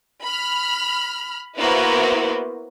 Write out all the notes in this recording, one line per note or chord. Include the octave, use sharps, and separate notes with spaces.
B5 F6
A#3 B3 E4 F#4 B4 C5